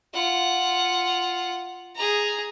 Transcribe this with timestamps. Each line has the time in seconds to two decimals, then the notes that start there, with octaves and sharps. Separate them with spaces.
0.14 F4 F#5
1.95 G#4 A#5